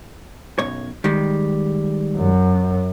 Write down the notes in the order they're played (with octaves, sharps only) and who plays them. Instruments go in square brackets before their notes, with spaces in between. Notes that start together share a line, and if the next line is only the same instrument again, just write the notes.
[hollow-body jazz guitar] B1 F#2 C#5
D#3 G3 G#3
[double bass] F#2